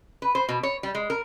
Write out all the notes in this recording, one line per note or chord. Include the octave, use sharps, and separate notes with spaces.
B4
C5
B2
C#5
G3
G#3
A#4